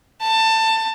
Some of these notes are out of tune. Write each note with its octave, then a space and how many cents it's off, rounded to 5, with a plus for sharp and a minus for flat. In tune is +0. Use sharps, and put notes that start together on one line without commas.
A5 +20